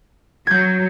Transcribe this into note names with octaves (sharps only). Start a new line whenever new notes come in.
F#3 G6 G#6